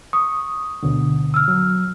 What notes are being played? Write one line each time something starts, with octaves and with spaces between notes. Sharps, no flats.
C#6 D#6
D2 B2 D3
E6 F6
F#3